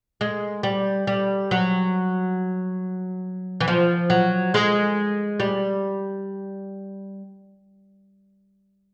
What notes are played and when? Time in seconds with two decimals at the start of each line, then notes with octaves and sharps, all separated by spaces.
0.21 G#3
0.63 G3
1.07 G3
1.51 F#3
3.60 E3
3.68 F3
4.10 F#3
4.54 G#3
5.40 G3